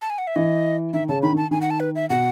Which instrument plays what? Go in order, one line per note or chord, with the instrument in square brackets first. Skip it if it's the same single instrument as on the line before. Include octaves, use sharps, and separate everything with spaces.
[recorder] A5
G#5
F#5
E5
[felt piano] E3 [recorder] D#5
[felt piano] D#3 [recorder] E5
[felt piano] C#3 [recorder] A5
[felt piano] D#3 [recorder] B5
[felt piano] D#3
[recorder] A5
[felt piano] D#3 [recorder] G#5
[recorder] F#5
A5
B4
E5
[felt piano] B2 [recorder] F#5